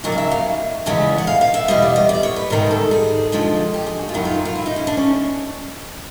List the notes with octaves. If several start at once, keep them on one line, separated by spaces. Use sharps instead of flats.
D#2 C#3 F#3 A#3 D5
F5
E5
F5
E2 C#3 E3 G#3 B3
F#5
F5
F5
E5
E2 B2 G3 B3 D#5
D5
D#5
D5
C#5
B4
G#2 D#3 G3 A#4
A4
G#4
F2 D3 F3 G#3
G4
G#4
F#4
F4
F#2 D#3 F#3 E4
F4
F4
E4
D#4
C#4
D4
C#4